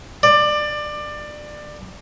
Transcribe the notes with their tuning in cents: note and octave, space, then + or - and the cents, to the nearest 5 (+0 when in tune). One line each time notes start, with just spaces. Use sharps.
D5 +20